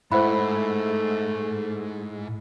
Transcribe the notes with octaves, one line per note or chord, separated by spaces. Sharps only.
G#2 A3 E4 C5 F#5 B5